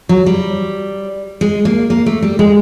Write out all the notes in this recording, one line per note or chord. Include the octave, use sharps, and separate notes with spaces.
F#3
G3
G#3
A#3
A#3
A3
G3
G#3